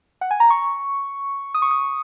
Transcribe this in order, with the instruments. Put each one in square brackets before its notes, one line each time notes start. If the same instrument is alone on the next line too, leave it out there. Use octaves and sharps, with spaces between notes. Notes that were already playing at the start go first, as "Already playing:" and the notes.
[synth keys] F#5
G#5
A#5
C#6
D#6
C#6
D#6